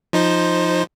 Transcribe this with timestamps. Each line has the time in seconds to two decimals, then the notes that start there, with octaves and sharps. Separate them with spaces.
0.13 F3 D#4 C5